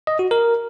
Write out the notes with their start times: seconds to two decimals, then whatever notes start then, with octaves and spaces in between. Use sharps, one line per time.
0.07 D#5
0.19 F#4
0.31 A#4